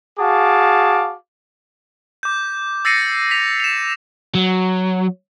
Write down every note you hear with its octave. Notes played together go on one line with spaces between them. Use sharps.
F#4 G#4 F5 A5 D6
D6 G6
E6 A6 A#6 C7 C#7 D#7
B6 F7
E7 F7
F#3